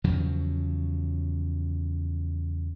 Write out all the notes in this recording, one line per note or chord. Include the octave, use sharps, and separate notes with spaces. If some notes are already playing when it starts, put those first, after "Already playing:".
E2 C#3 F3 F#3